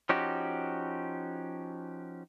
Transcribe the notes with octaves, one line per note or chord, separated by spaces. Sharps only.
F3 C#4 D#4 F#4 G4